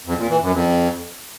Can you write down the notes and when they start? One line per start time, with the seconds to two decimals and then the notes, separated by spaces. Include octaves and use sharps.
0.06 F2
0.18 A#2
0.29 E3
0.41 F#2
0.53 F2